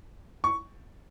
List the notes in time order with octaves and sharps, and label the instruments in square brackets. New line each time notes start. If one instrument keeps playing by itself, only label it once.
[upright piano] C#6